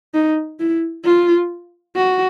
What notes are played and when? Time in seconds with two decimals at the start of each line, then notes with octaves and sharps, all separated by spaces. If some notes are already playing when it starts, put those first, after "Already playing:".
0.14 D#4
0.60 E4
1.04 F4
1.96 F#4